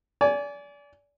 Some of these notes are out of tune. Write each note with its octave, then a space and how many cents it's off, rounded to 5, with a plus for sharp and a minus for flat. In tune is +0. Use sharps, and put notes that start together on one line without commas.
D5 -30 G#5 +5